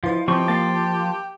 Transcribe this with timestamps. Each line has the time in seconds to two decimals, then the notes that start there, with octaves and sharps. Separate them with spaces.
0.04 F3 E4 F4 B4 D#5
0.28 F3 C4 G4 C#6
0.48 A#3 F5 A5 C6